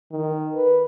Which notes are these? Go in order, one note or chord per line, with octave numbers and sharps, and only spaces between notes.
D#3
B4